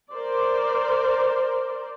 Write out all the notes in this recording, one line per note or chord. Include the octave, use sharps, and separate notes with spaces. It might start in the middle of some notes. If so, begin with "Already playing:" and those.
A#4 C5 D5